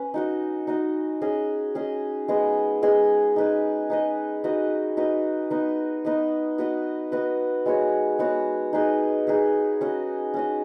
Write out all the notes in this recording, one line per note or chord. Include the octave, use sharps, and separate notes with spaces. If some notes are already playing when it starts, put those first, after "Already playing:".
Already playing: C#4 B4
D#4 F#4 D#5
D#4 F#4 D#5
C#4 G#4 D#5
C#4 G#4 D#5
G#3 B3 G#4 D#5
G#3 B3 G#4 D#5
D#4 B4 D#5
D#4 B4 D#5
D#4 F#4 B4 D#5
D#4 F#4 B4 D#5
B3 D#4 B4 D#5
B3 D#4 B4 D#5
B3 F#4 B4 D#5
B3 F#4 B4 D#5
G#3 B3 F#4 C#5
G#3 B3 F#4 C#5
D#4 G#4 B4 D#5
D#4 G#4 B4 D#5
C#4 F#4 D#5
C#4 F#4 D#5